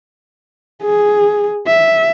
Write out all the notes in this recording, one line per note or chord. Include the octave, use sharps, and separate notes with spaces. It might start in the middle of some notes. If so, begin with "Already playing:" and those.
G#4
E5